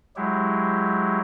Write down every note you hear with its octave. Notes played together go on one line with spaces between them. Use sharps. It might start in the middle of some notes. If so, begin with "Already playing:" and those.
F#3 G#3 E4 G4